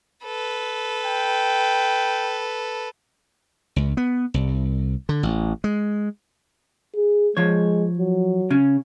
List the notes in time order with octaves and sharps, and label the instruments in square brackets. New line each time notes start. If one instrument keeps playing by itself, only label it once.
[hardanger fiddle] A4 B4
[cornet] G5
[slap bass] C#2
B3
C2
D3
A1
G#3
[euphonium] G#4
[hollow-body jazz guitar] F3 C#5 [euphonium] G#3
[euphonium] F#3
[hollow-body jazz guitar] C#3 C#4